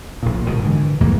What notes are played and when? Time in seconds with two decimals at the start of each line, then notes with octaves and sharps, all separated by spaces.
0.23 A#1 A#2
0.47 G#2 B2 D#3
0.63 D3 E3
1.01 E2 G#2 C3 A#3